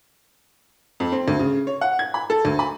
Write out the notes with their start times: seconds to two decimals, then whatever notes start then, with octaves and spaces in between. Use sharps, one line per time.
1.00 F2
1.12 C4
1.28 D2
1.39 C#3
1.67 C#5
1.81 F#5
1.99 G#6
2.14 B5
2.30 A4
2.45 D2
2.59 B5